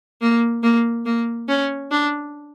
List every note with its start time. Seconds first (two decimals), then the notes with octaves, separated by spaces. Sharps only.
0.22 A#3
0.63 A#3
1.06 A#3
1.48 C#4
1.91 D4